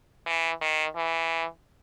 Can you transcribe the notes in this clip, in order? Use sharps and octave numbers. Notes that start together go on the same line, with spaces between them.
E3
D#3
E3